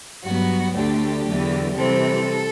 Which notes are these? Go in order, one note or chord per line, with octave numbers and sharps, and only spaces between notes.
G2 F#3 B3 F#4
D2 D3 A3 D4 G4
E2 D3 F#3
C3 E3 G3 C4 A4